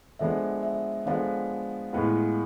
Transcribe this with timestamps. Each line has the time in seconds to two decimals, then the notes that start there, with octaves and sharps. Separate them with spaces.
0.19 D3 F3 G#3 B3 E5
0.63 E5
1.06 D3 F3 G#3 B3 F5
1.93 A2 G#3 B3 F4